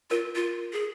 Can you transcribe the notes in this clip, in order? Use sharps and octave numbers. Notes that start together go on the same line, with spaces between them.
F4 A#4
F4
G#4